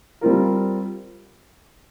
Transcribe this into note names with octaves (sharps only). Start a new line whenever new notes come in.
G3 C4 F4 A#4